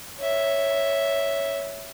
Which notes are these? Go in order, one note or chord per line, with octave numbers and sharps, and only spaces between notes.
C#5 E5